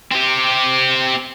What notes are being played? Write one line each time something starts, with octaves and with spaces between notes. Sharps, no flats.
C4 G4